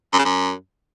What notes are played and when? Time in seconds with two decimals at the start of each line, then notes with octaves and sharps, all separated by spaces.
0.13 F#2
0.19 C#3
0.25 F#2